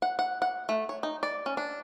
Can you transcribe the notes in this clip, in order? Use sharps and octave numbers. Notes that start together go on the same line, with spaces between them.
F#5
F#5
F#5
A3
C#5
D#4
D5
C#4
D4